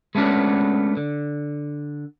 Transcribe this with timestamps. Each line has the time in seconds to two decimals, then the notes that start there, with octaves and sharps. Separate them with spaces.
0.15 G#3 A3 B3 C#4 D4 F#4
0.97 D3